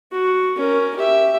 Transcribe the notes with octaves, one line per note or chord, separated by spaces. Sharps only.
F#4
C#4 A#4
G4 E5